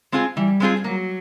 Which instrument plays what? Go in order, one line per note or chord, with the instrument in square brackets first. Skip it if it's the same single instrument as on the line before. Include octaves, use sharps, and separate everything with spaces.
[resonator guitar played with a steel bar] G#3 C4 F4 G#4
[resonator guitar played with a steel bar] E3 [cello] G3
[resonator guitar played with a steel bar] G#3 C4 F4 G#4
[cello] F#3 [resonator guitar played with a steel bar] A#3